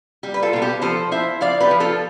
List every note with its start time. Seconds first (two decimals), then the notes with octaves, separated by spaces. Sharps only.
0.23 G3 G4
0.34 B4
0.42 F4 A4
0.53 B2 A4
0.62 G4 B4
0.81 F3 A4 C5
1.11 E4 C5 E5
1.41 F3 D5 F5
1.60 G4 B4
1.71 F3
1.80 F4 A4